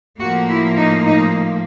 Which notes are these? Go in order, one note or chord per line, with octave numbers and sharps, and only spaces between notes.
A2 F3 A#3 F#4
E4
D#4
D#4